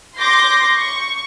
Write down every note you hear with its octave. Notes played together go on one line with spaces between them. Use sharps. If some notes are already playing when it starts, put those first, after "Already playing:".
C6 D6 G6 A#6
C#6